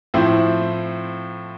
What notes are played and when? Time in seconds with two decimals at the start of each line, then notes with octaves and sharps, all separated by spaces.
0.14 A2 F3 C4 E4